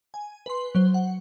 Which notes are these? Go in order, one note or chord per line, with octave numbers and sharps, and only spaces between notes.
G#5
B4 C6
F#3 C5
F#5